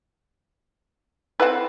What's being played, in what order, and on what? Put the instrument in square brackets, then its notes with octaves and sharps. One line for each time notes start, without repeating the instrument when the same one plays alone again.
[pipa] C4 B4 [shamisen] E4 A4 F#5